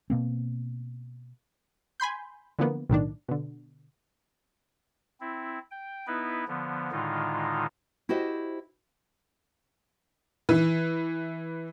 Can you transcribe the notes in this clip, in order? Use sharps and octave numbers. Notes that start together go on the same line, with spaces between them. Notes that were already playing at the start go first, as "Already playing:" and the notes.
B2 A#3 C4
G#5 B5 C6 G6
D3 E3 F3 A#3 B3
B1 A2 D#3 D4
B2 D3
C4 E4
G5
B3 D#4 E4 B4
D3 F3 B3
A2 D3 D#3 G#3 D#4 F4
E4 F#4 G4 C5 D#5
E3